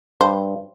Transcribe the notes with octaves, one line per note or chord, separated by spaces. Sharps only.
G2 C5